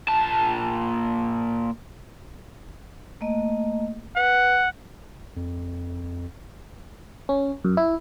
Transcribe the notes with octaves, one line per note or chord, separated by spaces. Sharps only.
A#2 A5
A3 A#3 D#5
B4 F#5
F2
C#4
F#2
E4